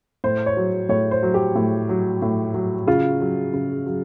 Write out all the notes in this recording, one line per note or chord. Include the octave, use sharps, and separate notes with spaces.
A2 C5
C#5
F#3
A2 C#5
C5
F#3
G4
A2
F#3
A2
F#3
C#3 F4
F#3
C#3
F#3